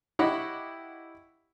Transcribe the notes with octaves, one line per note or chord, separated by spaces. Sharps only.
E4 G4 C#5 D#5 F#5 B5